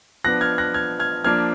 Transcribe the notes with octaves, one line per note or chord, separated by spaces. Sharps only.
F3 B3 D4 F#6 A#6
F6 G#6
F#6 A#6
F6 G#6
F6 G#6
F3 A#3 D4 F6 G#6